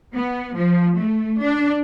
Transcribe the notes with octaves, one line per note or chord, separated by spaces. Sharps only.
B3
F3
A3
D4